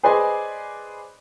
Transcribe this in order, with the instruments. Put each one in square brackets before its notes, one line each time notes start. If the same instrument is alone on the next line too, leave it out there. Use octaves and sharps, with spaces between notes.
[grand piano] G#4 B4 C5 D5 D#5 G#5